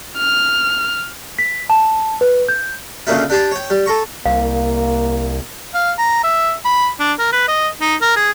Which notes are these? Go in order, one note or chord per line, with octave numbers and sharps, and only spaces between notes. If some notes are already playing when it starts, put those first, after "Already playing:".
F6
B6
A5
B4
G6
D2 A#2 C#3 A#3 D#4 E4
D4 G4 A5 C6
C#5 G5
G3
A4 A#5 C#6
C2 A#3 F5
F5
A#5
E5
B5
D4
A#4
B4
D#5
D#4
A#4
G#4